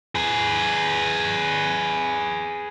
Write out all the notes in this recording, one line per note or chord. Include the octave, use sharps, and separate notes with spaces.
G#4 B4